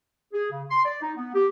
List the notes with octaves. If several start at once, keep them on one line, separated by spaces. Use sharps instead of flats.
G#4
C#3
C6
D5
D#4
B3
G4